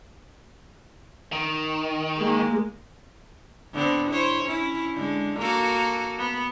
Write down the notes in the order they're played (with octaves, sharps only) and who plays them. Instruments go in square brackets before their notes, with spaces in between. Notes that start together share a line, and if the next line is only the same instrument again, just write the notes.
[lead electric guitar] D#3
[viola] G#3 A#3
[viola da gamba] D3 B3 C4
E4 C5 C#5
C#4 E4
D3 G#3
A#3 F#4 A4
B3